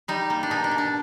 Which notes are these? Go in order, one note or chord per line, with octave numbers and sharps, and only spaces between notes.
G3 D#4
A#3
D4
B2 D#4
D4
B2
D4